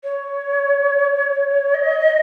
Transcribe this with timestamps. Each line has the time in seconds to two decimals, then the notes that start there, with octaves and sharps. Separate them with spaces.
0.04 C#5
1.74 D#5